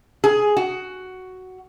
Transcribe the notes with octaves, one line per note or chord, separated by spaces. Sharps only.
G#4
F#4